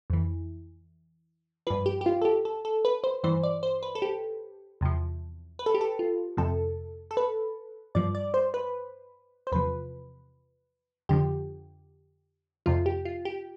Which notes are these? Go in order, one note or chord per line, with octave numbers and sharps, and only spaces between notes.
F2 E3
G2 F3 B4
G4
G4
F4
A4
G4
A4
A4
B4
C5
G2 E3 C5
D5
C5
B4
A4
G4
E2 C3 F3
B4
A4
G4
A4
F4
F2 C3 F3 A4
A4
B4
G2 F3 D5
D5
C5
B4
C5
E2 C3 F3 B4
F2 D3 F3 G4
F2 C3 F3 F4
G4
F4
G4